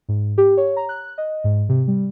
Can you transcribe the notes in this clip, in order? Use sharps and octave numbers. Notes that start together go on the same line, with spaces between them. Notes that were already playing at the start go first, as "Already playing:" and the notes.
G#2
G4
C#5
A#5
F#6
D#5
G#2
C3
G3